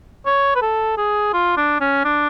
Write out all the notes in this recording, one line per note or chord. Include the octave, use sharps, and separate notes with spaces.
C#5
B4
A4
G#4
F4
D4
C#4
D4